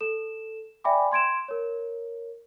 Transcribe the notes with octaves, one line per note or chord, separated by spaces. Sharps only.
A4 E7
D5 E5 G5 G#5 B5 D6
C6 G#6 D7 E7
A#4 C#5